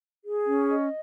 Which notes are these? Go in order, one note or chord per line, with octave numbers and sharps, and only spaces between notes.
G#4
C#4
D#5